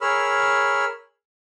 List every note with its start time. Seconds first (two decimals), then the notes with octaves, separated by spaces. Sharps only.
0.01 G#4 A#4 C#5 B5 E6 F6